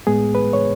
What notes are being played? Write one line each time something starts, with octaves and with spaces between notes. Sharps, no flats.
A2 G#3 B3 G#4
B4
C#5